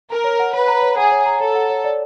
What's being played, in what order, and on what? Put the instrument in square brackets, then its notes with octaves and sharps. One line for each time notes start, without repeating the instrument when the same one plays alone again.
[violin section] A#4 [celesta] A#5
[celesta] C#5
F#5
[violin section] B4 [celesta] C#5
[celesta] A#5
C#5
[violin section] G#4 [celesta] F#5
[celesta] C#5
A#5
[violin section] A4 [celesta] C#5
[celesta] F#5
C#5
D5